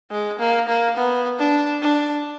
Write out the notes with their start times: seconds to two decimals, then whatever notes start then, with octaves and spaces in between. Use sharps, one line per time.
0.11 G#3
0.39 A#3
0.68 A#3
0.97 B3
1.39 D4
1.82 D4